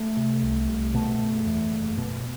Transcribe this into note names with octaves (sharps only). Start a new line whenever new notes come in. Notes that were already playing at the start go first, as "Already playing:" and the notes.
Already playing: A3
C3
C2
C2
B2 A3
F#1
E2
F#1
B2